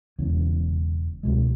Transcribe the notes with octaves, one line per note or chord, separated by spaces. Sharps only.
E1 E2 C#3
C#2 B2 G#3